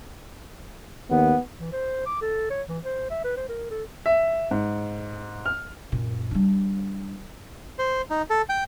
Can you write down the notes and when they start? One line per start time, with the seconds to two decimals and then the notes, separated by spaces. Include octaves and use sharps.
1.11 D#2 B3
1.60 E3
1.72 C5
2.06 D6
2.22 A4
2.51 C#5
2.69 E3
2.85 C5
3.11 E5
3.24 B4
3.37 C5
3.49 A#4
3.71 A4
4.06 E5
4.51 G#2
5.46 F6
5.92 F#2 A#2
6.31 G3 D4
7.79 C5
8.10 D#4
8.30 A4
8.49 G5